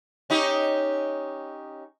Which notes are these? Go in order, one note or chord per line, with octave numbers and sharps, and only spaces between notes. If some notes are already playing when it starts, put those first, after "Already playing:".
C#4 D#4 G4